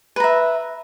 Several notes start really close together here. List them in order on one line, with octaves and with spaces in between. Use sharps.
B4 A#5 E5